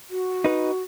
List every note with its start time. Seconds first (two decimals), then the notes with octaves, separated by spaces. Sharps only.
0.10 F#4
0.44 D#4 B4